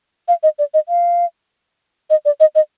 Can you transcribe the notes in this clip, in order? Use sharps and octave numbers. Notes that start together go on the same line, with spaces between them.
F5
D#5
D5
D#5
F5
D#5
D5
D#5
D#5